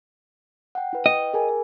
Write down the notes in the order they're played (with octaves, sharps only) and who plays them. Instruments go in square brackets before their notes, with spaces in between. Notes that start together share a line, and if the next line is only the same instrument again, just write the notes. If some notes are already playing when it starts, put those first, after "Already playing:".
[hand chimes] F#5 G5
E4 B4
[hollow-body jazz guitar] D#5 [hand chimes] G5
[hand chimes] G#4 A#4 G#5